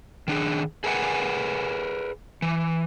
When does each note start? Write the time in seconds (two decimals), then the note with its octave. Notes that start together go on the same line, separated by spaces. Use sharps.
0.28 D#3 D4 G#4
0.84 G#4 A#4 B4 E5 F#5 G#5
2.42 E3